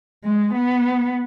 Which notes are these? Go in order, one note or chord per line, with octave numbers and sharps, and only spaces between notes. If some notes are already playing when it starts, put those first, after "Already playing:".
G#3
B3